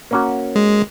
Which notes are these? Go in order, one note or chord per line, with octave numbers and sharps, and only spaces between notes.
A#3 C#4 F#4
G#3